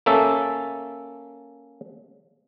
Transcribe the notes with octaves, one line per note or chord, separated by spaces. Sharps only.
A#3 C#4 A4 E5